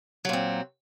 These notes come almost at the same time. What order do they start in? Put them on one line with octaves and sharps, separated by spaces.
F#3 A#2 C4